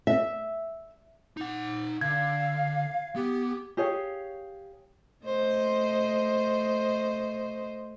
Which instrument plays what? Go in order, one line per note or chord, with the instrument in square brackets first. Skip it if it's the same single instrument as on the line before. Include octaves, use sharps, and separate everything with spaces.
[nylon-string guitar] E5
[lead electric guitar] D#4 F#5
[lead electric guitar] D3 [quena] F5 [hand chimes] G#6
[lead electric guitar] B3 [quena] G4
[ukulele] G4 G#4 C#5 F5
[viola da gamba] A3 C5 D#5